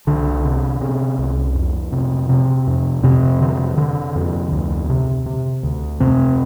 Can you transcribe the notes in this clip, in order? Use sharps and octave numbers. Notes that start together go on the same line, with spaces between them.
C2 D3 D4
C3
C3
C2
F2
C3
C3
F2
F2 C3 C4
D3
D3
F2
D2
C3
C3
D2
F2 C3 C4